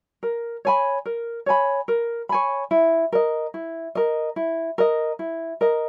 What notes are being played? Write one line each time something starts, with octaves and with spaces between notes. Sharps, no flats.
A#4
C#5 G#5 B5
A#4
C#5 G#5 B5
A#4
C#5 G#5 B5
E4
A#4 D#5
E4
A#4 D#5
E4
A#4 D#5
E4
A#4 D#5